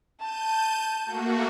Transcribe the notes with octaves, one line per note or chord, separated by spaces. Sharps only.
A5 G6 D#7
A3 A#3 F#4